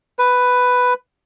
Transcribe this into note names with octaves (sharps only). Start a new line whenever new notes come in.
B4